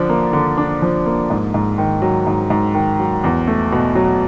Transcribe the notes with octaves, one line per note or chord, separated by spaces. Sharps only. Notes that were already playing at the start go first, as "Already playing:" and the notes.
Already playing: D3 F3 D4
A#3
D3
D4
F3
A#3
G#2
G#2
D#3
F#3
G#2
G#2
D#3
F#3
E2
A3
B2
F#3